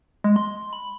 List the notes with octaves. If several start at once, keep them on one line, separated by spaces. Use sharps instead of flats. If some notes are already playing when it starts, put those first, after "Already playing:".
G#3
C6
B5